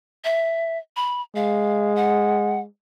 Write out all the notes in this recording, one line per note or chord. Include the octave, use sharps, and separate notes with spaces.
E5
B5
G#3 F5
F#5